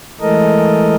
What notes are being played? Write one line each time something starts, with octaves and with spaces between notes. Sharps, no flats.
E3 G#3 A3 A4 A#4 D#5